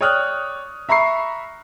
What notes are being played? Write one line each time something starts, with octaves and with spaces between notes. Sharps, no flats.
C#5 D5 G5 D#6 F6 F#6
E5 A#5 B5 C#6 C7